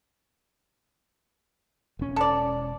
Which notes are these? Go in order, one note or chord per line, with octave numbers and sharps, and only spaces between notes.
E1 C#4
A4 D5